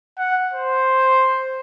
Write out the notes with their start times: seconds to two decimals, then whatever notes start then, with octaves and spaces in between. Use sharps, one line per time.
0.18 F#5
0.53 C5